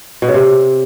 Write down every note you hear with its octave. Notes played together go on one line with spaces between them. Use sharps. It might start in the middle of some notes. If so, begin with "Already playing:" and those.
B2
C#3
C3